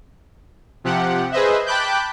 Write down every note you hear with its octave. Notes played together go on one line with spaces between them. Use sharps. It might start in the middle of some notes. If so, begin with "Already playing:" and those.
C3 F3 G4 F#5
G#4 B4 C5 D#5 E5
G5 A5 B5 D6 F#6 G6